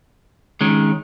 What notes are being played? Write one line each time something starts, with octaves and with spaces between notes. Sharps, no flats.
D#3 G#3 C#4